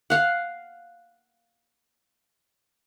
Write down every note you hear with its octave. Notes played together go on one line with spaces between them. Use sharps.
F5 F#5